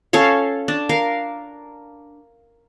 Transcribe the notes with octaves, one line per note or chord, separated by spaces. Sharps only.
C#4 A4 C#5 F5
D4
A#4 F5